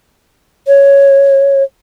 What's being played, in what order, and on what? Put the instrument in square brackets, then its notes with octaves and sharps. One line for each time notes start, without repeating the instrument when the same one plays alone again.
[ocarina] C#5